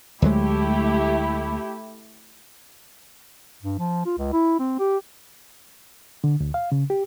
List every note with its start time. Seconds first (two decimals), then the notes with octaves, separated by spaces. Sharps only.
0.22 D2 F#3 G#3 A3 E4 G4
3.63 G2
3.79 F3
4.05 F4
4.18 C#2
4.33 E4
4.60 C4
4.79 G4
6.24 D3
6.40 D2
6.54 F5
6.72 C#3
6.90 G4